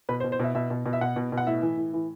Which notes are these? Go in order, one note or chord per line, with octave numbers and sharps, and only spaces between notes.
B2 B4
C5
B2
C5
B2 E5
B2 E5
B2
B2
E5
B2 F#5
B2
B2
F#5
A2 E5
E3
A2
E3